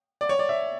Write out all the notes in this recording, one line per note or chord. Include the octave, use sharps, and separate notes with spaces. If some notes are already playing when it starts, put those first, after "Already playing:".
D5
C#5
D5
E5